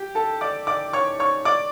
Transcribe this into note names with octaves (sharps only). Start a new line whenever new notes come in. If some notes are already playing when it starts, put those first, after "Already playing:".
Already playing: G4 G5
A4 A5
D5 D6
D5 D6
C#5 C#6
C#5 C#6
D5 D6